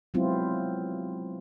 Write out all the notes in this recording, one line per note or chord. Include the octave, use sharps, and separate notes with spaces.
F#3 G#3 B3 C4 E4 F4